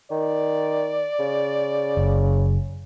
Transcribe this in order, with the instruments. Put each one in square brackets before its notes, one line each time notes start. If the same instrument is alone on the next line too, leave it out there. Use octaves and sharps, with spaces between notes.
[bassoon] D#3 [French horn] D5
[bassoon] C#3
[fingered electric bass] F#1